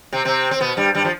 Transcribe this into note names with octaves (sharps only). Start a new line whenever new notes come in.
C3 C4
C3 C4
C4
B2 B3
G2 G3
G2 G3
F3